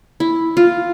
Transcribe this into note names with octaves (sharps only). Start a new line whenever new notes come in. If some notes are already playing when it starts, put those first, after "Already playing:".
E4
F4